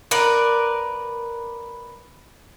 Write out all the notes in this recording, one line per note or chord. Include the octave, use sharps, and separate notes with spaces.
A#4 B4 D5